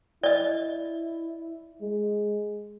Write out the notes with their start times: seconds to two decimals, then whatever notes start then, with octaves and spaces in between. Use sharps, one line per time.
0.23 E4 D5 D#5
1.82 G#3